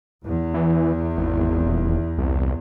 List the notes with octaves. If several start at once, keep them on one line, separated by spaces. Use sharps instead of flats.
E2
E3
G#1
D#1
C2